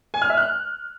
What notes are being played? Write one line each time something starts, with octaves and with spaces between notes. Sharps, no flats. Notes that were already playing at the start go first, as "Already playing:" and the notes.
G#5
F6
E5
F#6